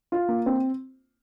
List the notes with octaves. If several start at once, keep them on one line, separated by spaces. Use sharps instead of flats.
F4
A#3
C4